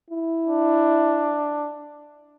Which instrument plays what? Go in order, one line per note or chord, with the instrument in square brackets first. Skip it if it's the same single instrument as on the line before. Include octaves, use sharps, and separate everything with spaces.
[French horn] E4
[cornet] D4